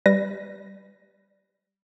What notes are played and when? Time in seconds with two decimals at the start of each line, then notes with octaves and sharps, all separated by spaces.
0.06 G3 B4 A#6